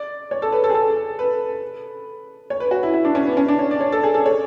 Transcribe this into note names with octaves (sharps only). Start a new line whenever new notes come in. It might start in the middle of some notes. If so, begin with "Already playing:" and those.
Already playing: D5
C#5
A4
B4
A4
G#4
A4
B4
C#5
B4
F#4
E4
E4
D4
C#4
B3
C#4
D4
C#5
D5
C#5
A4
G#4
A4
C#5